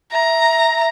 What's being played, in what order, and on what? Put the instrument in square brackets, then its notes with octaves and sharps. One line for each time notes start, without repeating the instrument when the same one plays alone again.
[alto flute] E5 [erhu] A#5